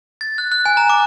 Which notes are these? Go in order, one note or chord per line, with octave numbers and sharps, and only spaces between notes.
A6
F#6
F#6
G#5
A#5
D6